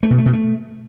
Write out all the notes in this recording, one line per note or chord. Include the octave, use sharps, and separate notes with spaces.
A3
B2
A3
B2
A3